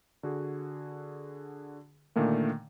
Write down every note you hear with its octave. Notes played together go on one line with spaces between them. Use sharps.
D3 F#4 G#4
A#2 D3 D#3 A3 A#3